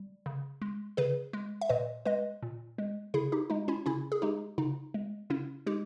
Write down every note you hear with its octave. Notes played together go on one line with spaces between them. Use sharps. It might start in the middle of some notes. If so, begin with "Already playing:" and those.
Already playing: G3
C#3
G#3
C#3 G#4 B4
G#3
E5
A#2 B4 D#5
G#3 B4 D#5
A#2
G#3
C#3 E4 G#4
D#4 G4
G#3 D#4
C#4 E4
C#3 C#4 E4
G#4
G#3 D#4 G4
C#3 D#4
G#3
C#3 C#4 E4
G#3 D#4 G4